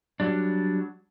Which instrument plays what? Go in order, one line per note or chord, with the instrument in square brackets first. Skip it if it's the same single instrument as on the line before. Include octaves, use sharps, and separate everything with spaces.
[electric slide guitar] F#3 G3 D4